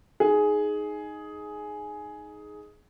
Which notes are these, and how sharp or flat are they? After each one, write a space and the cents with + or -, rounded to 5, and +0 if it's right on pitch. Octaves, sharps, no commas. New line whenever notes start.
D#4 +0 G#4 +10